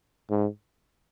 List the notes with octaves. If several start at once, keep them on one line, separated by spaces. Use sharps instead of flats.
G#2